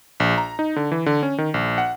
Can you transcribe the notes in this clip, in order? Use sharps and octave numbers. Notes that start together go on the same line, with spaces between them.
A#1
A#5
D#4
D3
E3
D3
C#4
D#3
A#1
F#5